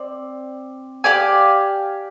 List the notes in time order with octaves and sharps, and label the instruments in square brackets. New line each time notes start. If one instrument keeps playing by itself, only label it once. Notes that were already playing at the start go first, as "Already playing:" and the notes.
Already playing: [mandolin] C4 D5
G4 D5 F5 G#5